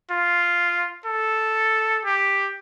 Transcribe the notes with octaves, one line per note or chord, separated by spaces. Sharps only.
F4
A4
G4